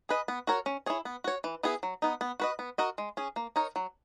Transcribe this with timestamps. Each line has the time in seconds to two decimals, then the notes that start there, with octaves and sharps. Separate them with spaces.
0.09 G#4 B4 D#5
0.28 B3
0.47 F#4 A#4 C#5
0.66 C#4
0.86 E4 G#4 C#5
1.05 B3
1.24 F#4 C#5
1.44 E3
1.63 B3 E4 G#4
1.83 F#3
2.02 B3 D#4
2.21 B3
2.40 F#4 B4 D#5
2.59 B3
2.78 F#4 A#4 D#5
2.98 G#3
3.17 C#4 G#4
3.36 A#3
3.56 D#4 A#4 C#5
3.76 F#3